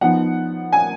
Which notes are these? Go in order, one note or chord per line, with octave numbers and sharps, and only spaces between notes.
F3 B3 D#4 F#5
G#5